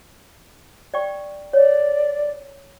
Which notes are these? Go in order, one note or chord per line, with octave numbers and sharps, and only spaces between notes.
D5 G5 C#6
C#5 D5